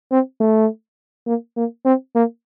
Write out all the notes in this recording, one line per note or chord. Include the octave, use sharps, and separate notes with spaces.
C4
A3
A#3
A#3
C4
A#3